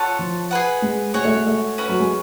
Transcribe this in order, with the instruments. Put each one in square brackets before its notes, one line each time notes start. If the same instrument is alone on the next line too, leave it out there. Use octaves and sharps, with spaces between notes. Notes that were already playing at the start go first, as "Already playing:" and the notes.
Already playing: [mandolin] F4 A4 C#5 F#5
[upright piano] F3
[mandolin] G#4 B4 F#5
[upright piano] G#3
[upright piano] G#3 [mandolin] F#4 C#5 G#5
[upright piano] A3
G#3
A3
[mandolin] C#4 F#4 B4
[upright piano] F#3
G#3